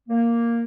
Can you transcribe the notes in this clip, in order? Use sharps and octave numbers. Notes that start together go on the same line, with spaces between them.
A#3